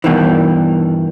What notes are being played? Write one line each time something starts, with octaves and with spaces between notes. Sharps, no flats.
G2 B2 D#3 E3